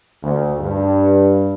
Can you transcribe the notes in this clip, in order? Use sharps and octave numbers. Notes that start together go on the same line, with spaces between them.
D2
G2